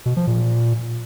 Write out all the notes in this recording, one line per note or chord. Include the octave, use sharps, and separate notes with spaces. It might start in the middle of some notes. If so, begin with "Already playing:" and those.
B2
F3
A#2